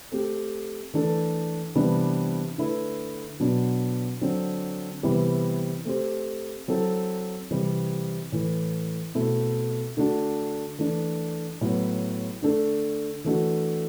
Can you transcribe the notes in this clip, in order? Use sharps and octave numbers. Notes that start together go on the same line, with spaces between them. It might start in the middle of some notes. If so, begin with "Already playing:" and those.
A3 C4 G4
E3 A3 D4 A4
C3 E3 G3 B3 D4
D3 A3 E4 B4
B2 F#3 B3 D4
D3 F#3 C4
C3 E3 G3 B3 E4
A3 C4 G4 C5
F#3 C4 E4 A4
C3 E3 G3
A2 E3 A3
B2 A3 C4 E4
D3 A3 D4 F#4
E3 A3 D4
A2 F#3 B3
D3 A3 D4 A4
E3 A3 D4 F#4